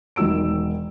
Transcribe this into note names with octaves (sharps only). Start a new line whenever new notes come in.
E1 D#3 F#3 E6 D7